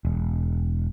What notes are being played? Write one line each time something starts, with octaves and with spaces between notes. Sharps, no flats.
E1